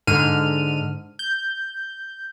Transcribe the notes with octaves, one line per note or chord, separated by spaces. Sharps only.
G#2 D3 F6 D#7
G6